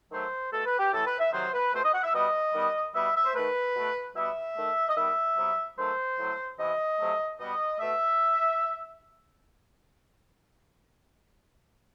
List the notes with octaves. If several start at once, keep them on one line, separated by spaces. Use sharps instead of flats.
D#3 F#3 A3 C5
B2 A3 A4
B4
G4
A2 E3 A3 A4
B4
E5
C3 D#3 F#3 C5
B4
B2 A3 C5
D#5
F#5
E5
B2 G3 B3 D#5
D#3 G3 B3
B2 G3 B3 E5
E5
C5
D#3 A3 B4
B2 A3
B2 G3 B3 E5
D#3 A3
D#5
D#3 G3 B3 E5
C3 F#3 B3
D#3 F#3 A3 C5
A2 F#3 A3
C3 E3 B3 D#5
C3 F#3 A3
B2 G3 B3 D#5
B2 A3 E5